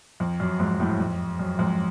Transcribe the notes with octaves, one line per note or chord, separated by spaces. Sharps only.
F2
F#2
F2 G#2
F#2 A2
F2
F#2
F2 G#2